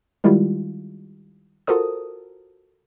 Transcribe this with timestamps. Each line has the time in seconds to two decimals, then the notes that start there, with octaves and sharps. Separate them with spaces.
0.24 D#3 G3 G#3 E4 F4 G4
1.67 F4 F#4 A4 A#4 C5 D#6